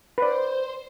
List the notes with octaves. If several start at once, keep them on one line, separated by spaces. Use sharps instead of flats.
B4 C5 D5